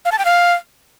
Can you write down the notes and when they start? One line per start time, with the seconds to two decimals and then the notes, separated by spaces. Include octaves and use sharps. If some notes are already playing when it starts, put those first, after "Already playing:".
0.05 F5
0.12 A5
0.19 G5
0.25 F5